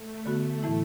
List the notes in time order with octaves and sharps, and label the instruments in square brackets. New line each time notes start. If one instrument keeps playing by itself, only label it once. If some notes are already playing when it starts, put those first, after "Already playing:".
Already playing: [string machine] A3
[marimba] D3 B3 F#4 [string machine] A3
[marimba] A2 E3 A3 E4